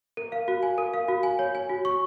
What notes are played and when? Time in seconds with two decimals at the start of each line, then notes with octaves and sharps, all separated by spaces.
0.17 A#4
0.32 F5
0.48 F#4
0.63 G#5
0.78 A#4
0.94 F5
1.08 F#4
1.23 G#5
1.39 C#5
1.55 G#5
1.69 F#4
1.85 C#6